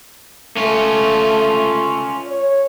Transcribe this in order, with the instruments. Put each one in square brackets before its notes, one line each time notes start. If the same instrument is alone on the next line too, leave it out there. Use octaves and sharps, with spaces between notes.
[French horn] A3 [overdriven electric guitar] C#4 F4
[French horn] C#5